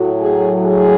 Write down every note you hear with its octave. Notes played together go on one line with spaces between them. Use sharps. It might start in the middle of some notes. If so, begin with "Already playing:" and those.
Already playing: A2 F#3
G#4
G#4